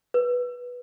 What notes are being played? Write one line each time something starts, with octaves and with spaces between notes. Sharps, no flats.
B4